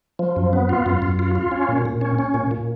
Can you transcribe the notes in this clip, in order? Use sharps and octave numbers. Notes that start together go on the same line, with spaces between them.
F3
F#2
B3
F4
F#2
F#2
F4
F4
C#4
A#2
A#2
C#4
C#4
A#2
A#2